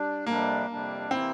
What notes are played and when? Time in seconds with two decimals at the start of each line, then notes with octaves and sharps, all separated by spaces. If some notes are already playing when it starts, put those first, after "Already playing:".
Already playing: G3 D4
0.26 F2 C3 G3 A#3 D4
0.68 F2 C3 G3 D4
1.11 C3 E3 A#3 C4 E4